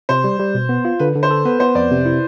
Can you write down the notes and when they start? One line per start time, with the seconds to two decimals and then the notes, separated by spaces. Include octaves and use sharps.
0.09 C3 C5
0.24 G3
0.40 G3
0.54 B2
0.69 B3
0.85 F4
0.99 D3 B4
1.15 D3
1.23 C5
1.31 A4
1.45 B3 B4
1.60 B3 C5
1.75 F2 D5
1.91 C3
2.05 E4